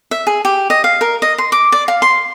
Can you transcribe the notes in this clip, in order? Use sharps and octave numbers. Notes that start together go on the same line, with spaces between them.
E5
G#4
G4
D#5
F5
A#4
D#5
C6
D6
D5
F5
C6